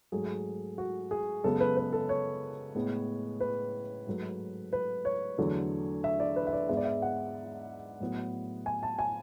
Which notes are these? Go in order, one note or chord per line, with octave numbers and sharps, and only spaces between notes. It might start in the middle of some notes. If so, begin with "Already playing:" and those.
G#2 F#3 A3 G#4
F#4
G#4
F#2 C#3 G#3 B3 A4
B4
B4
A4
C#5
A2 G#3 B3
B4
G#2 F#3 A3
B4
C#5
E2 D3 F#3 A3
E5
D5
B4
E5
D5
G#2 G#3 B3 E5
D5
E5
F#5
A2 F#3 B3
G#5
A5
G#5